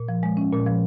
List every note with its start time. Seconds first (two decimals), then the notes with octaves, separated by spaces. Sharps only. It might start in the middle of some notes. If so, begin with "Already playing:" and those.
Already playing: A#2
0.08 F3
0.23 G#3
0.37 C#4
0.52 A#2
0.66 F3